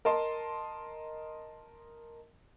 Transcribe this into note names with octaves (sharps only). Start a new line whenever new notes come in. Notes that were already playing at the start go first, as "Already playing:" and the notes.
A#4 D#5 A5 C6